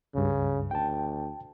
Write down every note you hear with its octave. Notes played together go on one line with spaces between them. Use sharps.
C#2 G2 C#3
D2 G5 A5